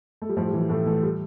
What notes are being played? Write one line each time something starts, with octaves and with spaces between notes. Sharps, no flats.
A3
G3
A2 F3
G3
E3
G3
A2 A3
E3 A3
G3